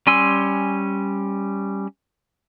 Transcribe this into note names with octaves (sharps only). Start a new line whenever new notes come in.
G3 C#4 G#5 C6 E6